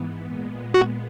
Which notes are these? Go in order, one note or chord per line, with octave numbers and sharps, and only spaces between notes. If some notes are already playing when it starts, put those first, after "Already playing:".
Already playing: G#2 E3 B3
A#2 G#3 B3
F#4